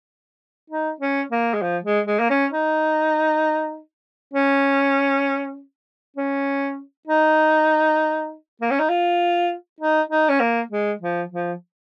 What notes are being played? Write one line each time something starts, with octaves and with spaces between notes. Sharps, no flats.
D#4
C#4
A#3
G#3
F3
G#3
G#3
A#3
C#4
D#4
C#4
C#4
D#4
A#3
C#4
D#4
F4
D#4
D#4
C#4
A#3
G#3
F3
F3